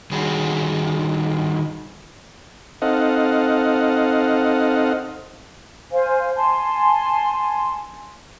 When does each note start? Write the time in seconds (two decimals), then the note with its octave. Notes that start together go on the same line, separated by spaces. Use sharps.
0.11 D#3 G3 C#4 F#4 G#4
2.82 C4 D#4 A4 D#5 F5 F#5
5.92 C5 F5 G#5
6.36 G#5 A5 C6